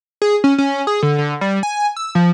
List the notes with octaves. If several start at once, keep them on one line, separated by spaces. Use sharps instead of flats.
G#4
C#4
C#4
G#4
D3
D3
G3
G#5
E6
F3